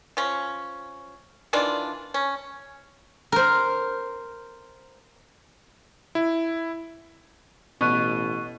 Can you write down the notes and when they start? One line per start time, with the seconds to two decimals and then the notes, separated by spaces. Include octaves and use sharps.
0.17 F3 C#4
1.53 D#3 E3 D4 F4
2.14 C#4
3.32 A#4 C5
6.15 E4
7.81 A1 B2 C#6 F#6 D#7